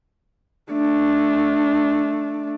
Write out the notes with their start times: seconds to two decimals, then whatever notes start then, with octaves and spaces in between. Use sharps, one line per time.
0.72 A3 D4